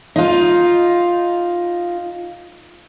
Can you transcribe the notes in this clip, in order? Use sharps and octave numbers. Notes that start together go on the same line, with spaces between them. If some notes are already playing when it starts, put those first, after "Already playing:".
D#4 F4